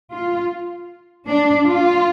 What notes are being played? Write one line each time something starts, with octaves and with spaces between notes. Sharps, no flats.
F4
D4
F4